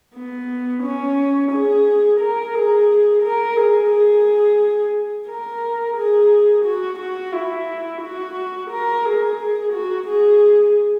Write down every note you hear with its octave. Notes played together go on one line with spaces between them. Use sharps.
B3
C#4
G#4
A#4
G#4
A#4
G#4
G#4
A#4
G#4
F#4
F#4
E4
F#4
A#4
G#4
F#4
G#4